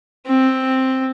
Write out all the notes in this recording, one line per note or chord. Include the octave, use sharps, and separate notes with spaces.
C4